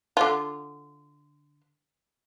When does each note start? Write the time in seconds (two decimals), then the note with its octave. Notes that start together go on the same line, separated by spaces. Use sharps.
0.17 D3 F4